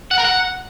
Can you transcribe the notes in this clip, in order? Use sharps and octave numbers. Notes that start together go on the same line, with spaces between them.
F#5
A#4
F#5